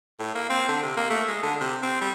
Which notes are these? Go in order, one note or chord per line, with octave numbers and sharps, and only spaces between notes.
A2
A#3
C4
D3
C3
A#3
A3
G#3
D3
C3
C4
G3